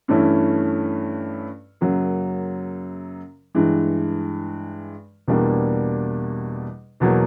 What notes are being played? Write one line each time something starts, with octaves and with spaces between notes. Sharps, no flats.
G2 E3 A3 C#4 E4
F#2 C#3 F#3 A#3
G2 E3 G#3
E2 B2 G3 A#3 D4
E2 B2 F#3 A#3